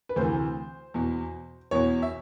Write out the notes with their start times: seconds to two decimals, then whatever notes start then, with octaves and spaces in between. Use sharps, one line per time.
0.09 B4
0.16 D2 C3 E3 C5
0.94 E2 B2
1.71 E2 B2 C#5
2.02 E5